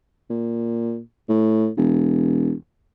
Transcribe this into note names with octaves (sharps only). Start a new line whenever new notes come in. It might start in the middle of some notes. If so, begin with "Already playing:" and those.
A#2
A2
E1